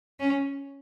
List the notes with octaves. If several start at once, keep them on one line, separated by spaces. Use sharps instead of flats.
C#4